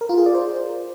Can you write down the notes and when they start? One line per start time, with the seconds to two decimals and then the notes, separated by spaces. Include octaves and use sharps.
0.01 A#4
0.09 F4
0.18 G#4
0.26 D5
0.35 C5